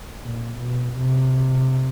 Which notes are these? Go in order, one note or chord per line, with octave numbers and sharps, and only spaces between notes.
A#2
B2
C3